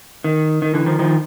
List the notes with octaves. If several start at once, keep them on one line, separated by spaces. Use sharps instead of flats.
D#3
D#3
D3 E3
D#3 F3
D#3 F3